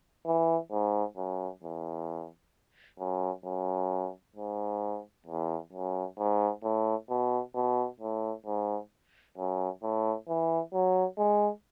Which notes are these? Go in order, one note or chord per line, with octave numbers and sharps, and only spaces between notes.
E3
G#2
F#2
E2
F#2
F#2
G#2
E2
F#2
G#2
A2
B2
B2
A2
G#2
F#2
A2
E3
F#3
G#3